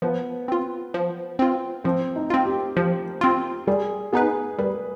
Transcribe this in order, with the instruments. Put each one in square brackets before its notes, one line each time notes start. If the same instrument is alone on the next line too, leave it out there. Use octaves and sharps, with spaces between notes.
[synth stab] F3 [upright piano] B3
[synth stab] C4 F4
F3
C4 F4
[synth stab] F3 [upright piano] C4
[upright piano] D#4
[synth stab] C4 F4
[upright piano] G4
[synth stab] F3 [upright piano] G4
[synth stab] C4 F4
[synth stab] G3 [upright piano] G#4
[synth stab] B3 D#4 B4 [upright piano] G#4
[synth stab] G3 [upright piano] B4